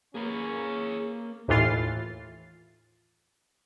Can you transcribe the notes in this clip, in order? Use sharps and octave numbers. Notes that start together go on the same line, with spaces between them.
A#3 C#4 G#4 B4
D#2 A2 E3 F4 A6 C7